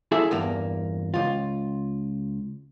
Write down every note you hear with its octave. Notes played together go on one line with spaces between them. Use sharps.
E4 G#4 A4 E5
E2 G2 A#3
C#2 F4